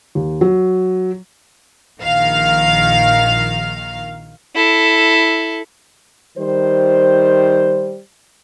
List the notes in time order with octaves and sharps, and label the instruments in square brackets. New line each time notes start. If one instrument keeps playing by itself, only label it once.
[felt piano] D#2
F#3
[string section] A#1 D#3 F5
[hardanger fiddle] E4 A4
[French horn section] D#3 G3 C5